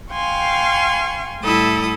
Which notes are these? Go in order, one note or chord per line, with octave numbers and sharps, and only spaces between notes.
F5 G5 G#5 C6 C#6
A2 G3 E4 A4 D#6